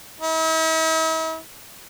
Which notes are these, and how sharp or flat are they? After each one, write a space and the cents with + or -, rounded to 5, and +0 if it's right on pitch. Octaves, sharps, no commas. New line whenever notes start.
E4 -45